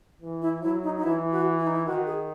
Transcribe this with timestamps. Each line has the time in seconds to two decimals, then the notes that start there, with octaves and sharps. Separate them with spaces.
0.22 E3
0.42 E4
0.62 F#3 E4
0.83 D#4
0.98 D#4
1.03 E3 E4
1.32 F#4
1.59 E4
1.67 D#4
1.75 E4
1.86 D#3 F#4
2.06 G#4